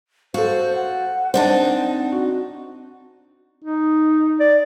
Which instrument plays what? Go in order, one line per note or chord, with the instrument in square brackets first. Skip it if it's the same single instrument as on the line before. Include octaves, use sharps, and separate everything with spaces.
[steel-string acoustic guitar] F#4 [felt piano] A4 F5 [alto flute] C5
[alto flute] F#5
[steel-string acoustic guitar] C4 D4 D#4 [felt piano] C5 A5
[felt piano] F#4
[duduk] D#4
[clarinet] D5